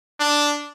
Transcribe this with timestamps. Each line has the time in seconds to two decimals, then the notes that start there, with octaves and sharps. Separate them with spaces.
0.20 D4